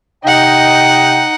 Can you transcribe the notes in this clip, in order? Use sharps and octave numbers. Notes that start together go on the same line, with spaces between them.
C3 D#4 D#5 F#5 G5